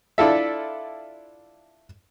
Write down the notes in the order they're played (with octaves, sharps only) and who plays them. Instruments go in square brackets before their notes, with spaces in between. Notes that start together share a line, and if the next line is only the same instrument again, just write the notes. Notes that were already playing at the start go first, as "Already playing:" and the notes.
[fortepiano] D4 E4 F4 A4 E5